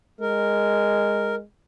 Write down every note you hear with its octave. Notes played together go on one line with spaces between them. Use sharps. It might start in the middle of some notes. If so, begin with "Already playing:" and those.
G#3 A#4